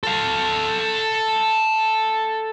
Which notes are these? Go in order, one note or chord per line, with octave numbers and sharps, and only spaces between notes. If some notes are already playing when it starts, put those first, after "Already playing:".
A4 F5